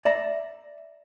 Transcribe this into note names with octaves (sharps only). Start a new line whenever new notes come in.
D5 E5 A#5